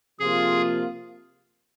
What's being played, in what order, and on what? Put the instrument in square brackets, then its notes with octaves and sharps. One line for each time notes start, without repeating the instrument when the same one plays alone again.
[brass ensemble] C3 F3 A#3 F4 [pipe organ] G#4